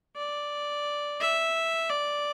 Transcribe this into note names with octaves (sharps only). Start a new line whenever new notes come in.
D5
E5
D5